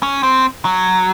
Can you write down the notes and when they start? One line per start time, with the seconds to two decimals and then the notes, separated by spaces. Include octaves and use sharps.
0.03 C#4
0.23 C4
0.65 F#3